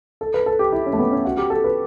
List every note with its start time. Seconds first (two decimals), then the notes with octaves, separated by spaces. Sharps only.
0.21 A4
0.34 B4
0.46 A4
0.59 G4
0.72 E4
0.86 C#4
0.93 A3
0.99 B3
1.11 C#4
1.25 F#4
1.37 G4
1.50 A4
1.64 B4